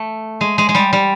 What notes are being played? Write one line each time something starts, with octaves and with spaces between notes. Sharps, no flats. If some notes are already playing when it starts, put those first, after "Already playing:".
Already playing: A3
G#3
G#3
G#3
G3
G3